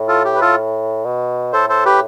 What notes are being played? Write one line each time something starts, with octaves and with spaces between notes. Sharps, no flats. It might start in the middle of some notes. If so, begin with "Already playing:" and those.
Already playing: A2
F4 A4
G4
B4
F4 A4
B2
A2 A4 C5
A4 C5
G4 B4